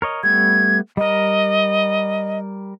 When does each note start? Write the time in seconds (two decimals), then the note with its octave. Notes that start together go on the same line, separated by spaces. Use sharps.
0.02 A#4 C#5 D#5
0.23 G3 A3 B3 G#6
0.97 G3 A#4 D#5